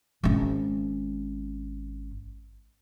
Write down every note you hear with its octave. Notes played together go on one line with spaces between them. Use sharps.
G#1 C#4